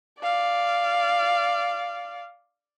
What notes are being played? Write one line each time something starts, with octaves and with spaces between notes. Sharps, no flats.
D5 F5